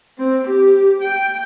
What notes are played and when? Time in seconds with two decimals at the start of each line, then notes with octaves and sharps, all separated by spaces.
0.18 C4
0.48 G4
1.02 G5